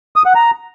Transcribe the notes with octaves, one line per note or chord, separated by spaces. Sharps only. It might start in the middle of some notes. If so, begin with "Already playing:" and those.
D#6
F#5
A#5